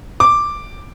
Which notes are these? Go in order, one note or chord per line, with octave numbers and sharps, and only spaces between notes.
D6